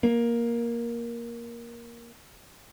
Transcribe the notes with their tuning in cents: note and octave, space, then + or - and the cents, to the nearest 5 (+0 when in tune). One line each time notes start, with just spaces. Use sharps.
A#3 +10